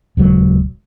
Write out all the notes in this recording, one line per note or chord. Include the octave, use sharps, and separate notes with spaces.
D#1 C#2 F#3